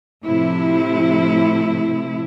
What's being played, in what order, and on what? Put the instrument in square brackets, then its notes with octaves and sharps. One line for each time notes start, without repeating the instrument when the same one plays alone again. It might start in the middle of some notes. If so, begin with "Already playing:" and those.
[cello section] A2 C3 F3 E4